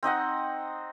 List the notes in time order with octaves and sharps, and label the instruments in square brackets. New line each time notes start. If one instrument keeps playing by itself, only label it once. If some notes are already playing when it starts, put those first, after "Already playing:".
[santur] C4 D#4 D#5 F#5